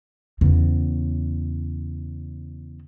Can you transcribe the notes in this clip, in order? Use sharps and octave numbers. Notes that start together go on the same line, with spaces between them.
E2 C#3